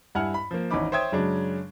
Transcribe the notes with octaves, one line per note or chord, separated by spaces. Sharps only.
G2 E4 F#5 G#5 F6
B5
F3 A#3
G#1 E3 C#4 D#4 B5 D6
C5 C#5 E5 G5 D#6 G#6
F#2 C#3 F#3 G#3 D4